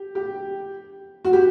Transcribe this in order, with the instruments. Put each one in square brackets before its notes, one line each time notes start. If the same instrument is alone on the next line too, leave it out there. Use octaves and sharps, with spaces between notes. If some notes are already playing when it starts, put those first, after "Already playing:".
Already playing: [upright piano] G4
G4
F#4
G4